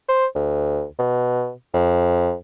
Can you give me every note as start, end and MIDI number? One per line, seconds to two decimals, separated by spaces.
0.09 0.25 72
0.35 0.84 38
0.99 1.51 47
1.73 2.34 41